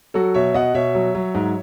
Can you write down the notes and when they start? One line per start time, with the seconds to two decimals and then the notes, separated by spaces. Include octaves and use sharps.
0.14 F#3 F#4 A4
0.34 B2 C#5 E5
0.54 B2 D#5 F#5
0.74 B2 C#5 E5
0.95 F#3
1.15 F#3
1.35 G#2